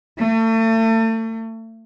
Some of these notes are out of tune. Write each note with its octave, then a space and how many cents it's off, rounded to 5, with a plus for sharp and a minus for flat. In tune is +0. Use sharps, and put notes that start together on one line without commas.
A3 +35